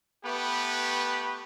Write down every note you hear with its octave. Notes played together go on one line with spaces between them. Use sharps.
A3 B3 G4 B4